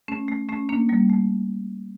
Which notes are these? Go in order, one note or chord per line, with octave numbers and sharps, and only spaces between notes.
A3 C#4
A3
A3 C#4
A#3 D4
G3 A#3
A3